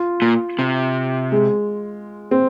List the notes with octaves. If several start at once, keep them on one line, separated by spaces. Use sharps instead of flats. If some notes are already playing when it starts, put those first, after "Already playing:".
Already playing: F4
A#2
C3
G#3
C4